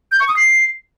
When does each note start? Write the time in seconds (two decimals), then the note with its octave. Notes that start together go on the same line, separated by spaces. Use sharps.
0.12 G6
0.20 C#6
0.28 D#6
0.37 C7